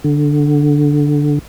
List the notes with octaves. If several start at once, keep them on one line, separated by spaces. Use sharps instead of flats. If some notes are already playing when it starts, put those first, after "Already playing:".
D3